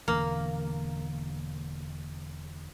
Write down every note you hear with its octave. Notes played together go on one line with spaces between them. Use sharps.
E1 E2 D3 A#3